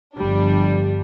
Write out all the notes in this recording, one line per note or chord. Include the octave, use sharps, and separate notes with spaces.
G1 F3 G3 D4